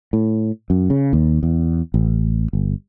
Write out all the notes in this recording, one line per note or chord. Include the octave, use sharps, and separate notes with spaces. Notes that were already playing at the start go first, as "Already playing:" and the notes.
A2
F#2
C#3
D#2
E2
A1
G1